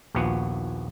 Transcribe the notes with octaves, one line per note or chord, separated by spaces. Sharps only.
A#1 D#2 F3 B3 F#4 F#5